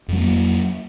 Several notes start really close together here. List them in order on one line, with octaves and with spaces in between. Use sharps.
F2 F#3 A3 A#3